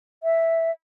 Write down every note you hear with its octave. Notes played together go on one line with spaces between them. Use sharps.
E5